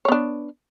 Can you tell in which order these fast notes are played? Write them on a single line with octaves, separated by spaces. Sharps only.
C#5 B3 D4